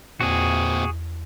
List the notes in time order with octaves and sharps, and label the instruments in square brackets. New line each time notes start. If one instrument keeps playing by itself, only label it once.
[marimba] E2 [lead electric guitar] A#2 C4 [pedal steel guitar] F#4 G#4